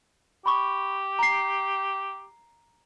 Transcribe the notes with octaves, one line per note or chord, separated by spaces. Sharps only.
G4 B5 C#6
A#5 C7